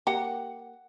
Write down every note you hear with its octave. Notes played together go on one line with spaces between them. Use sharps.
A#3 G4 F#5